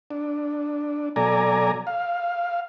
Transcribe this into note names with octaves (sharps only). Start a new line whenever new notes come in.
D4
B2 F#3 A4 D5 G#5 A#5
F5